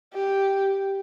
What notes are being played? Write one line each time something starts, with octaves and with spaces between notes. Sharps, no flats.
G4